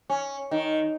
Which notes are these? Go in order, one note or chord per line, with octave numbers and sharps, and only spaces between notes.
C#4
D#3